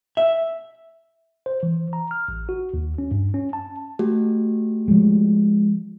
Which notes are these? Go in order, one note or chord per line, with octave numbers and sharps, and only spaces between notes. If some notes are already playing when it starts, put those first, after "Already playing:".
E5
C5
E3
A#5
F6
A1
F#4
D#2
C#4
G2
C#4
A5
A3 F#4 G4
F3 G#3